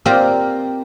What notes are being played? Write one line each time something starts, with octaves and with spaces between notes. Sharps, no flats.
A#3 C4 F4 G4 D5 A#5